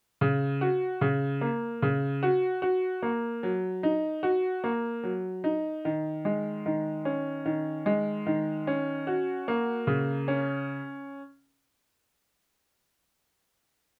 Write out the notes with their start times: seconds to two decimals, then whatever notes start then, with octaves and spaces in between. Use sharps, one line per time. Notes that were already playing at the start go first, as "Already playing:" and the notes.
0.21 C#3
0.61 F#4
1.01 C#3
1.41 A#3
1.82 C#3
2.23 F#4
2.62 F#4
3.02 A#3
3.43 F#3
3.83 D#4
4.23 F#4
4.64 A#3
5.04 F#3
5.44 D#4
5.85 D#3
6.25 G#3
6.66 D#3
7.05 C#4
7.46 D#3
7.86 G#3
8.26 D#3
8.67 C#4
9.07 F#4
9.48 A#3
9.87 C#3
10.28 C#4